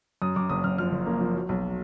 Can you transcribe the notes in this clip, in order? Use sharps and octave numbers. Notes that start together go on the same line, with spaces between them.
F#2 D#6
F#2 D6
F#1 D#6
F#1 F6
F3 F6
F#1
A#3
F3
F#3
B1